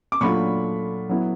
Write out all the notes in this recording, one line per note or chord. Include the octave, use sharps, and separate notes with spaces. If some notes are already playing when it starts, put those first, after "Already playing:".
D6
A#2 F#3 A3 D4 F4 B5 C#6
F#3 B3 E4